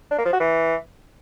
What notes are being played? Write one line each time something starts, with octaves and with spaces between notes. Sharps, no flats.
D4
A#3
F3
F#4
E3